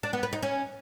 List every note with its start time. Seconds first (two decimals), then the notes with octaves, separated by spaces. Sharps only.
0.03 D4
0.13 B3
0.23 B4
0.33 D#4
0.42 C#4